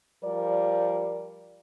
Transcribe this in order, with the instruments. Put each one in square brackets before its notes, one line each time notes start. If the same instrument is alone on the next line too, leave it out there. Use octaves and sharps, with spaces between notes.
[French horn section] F3 G3 A#4 D5